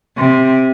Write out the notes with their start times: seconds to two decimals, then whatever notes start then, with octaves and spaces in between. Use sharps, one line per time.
0.17 C3